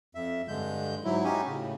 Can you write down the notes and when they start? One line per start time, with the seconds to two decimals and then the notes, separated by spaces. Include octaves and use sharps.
0.15 F2 E5
0.48 G2 D3 G#3 G6
1.04 G#2 F#3 E4
1.24 C#4 D#4 F#4 G4 G#5
1.47 A2 C#3